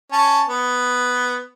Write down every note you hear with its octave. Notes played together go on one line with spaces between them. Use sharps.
C#4 A5
B3